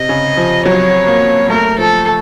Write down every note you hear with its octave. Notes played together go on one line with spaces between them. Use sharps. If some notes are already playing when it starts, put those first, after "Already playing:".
Already playing: C3 D#5
C#3
F3
F#3 C#5
A#3
A3 A#4
F3 A4